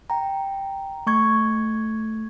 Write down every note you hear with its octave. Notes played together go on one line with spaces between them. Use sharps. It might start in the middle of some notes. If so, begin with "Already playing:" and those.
G5 A#5
A3 C#6 G#6